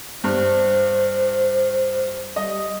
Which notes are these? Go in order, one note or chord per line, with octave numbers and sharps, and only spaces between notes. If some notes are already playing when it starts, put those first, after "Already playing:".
G2 C5
G3 D#5